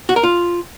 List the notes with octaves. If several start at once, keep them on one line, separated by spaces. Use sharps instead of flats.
F#4
A#4
F4